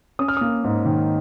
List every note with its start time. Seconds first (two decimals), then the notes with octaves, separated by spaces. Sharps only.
0.19 C#4 D#6
0.28 F6
0.37 A#3 D#6
0.64 G#2
0.85 D#3